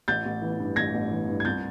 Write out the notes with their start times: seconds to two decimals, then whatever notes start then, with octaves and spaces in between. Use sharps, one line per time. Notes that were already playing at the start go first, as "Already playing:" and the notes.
0.08 A1 G6 A6
0.26 A1
0.42 E3
0.60 G2
0.76 A1 G#6 A#6
0.94 A1
1.11 E3
1.28 G2
1.40 G#6
1.45 C2 G6 A6